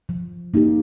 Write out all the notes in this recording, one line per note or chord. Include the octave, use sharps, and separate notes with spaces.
F3
A#3 D#4 G4